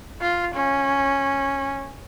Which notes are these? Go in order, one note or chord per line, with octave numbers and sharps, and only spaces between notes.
F4
C#4